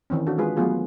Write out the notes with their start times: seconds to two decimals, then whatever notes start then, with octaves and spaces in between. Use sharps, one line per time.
0.10 D#3 E3 C4 C#4
0.27 D4 F#4 A4
0.38 G#3 F4 G#4 B4
0.57 F#3 A3 B3 F4 G#4